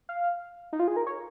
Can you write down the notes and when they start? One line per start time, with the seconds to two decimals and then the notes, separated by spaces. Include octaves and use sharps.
0.09 F5
0.73 D#4
0.79 F4
0.88 G#4
0.97 A#4
1.07 C#5